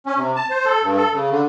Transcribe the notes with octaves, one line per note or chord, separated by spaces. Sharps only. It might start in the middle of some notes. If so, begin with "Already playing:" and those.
C#4
C3
A5
C5
A4
G2
A4
C#3
D3